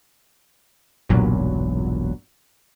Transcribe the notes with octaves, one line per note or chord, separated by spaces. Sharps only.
E1 B1 G2 A#2 F#3